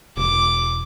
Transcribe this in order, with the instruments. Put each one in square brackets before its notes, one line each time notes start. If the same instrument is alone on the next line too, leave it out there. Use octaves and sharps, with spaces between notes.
[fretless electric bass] E1 [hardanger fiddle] D6